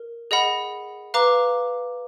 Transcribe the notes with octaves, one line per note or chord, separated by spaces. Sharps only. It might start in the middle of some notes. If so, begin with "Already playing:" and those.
Already playing: A#4
G#4 D#5 F#5 B5
B4 F5 A#5 D6